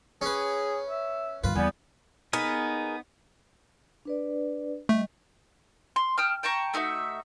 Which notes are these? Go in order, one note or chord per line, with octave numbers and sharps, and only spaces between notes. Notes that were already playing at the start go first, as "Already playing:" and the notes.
C#4 G#4 B4
E5
G2 D#3 F4 B4
E2 G3 B3 G#5
B3 D#4 G#4 A#4
D4 B4 D5
G3 A3 D#5
C6
G5 A5 D#6 F6
G5 A5 A#5 C#6
A3 D#4 F#4 E5